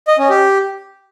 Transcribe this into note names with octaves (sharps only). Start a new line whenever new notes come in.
D#5
C#4
G4